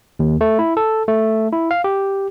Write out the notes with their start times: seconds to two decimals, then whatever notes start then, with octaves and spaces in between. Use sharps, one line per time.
0.19 D#2
0.41 A3
0.59 E4
0.77 A4
1.08 A3
1.52 E4
1.71 F5
1.84 G4